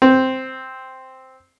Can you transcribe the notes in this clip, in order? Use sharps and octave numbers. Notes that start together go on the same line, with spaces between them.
C4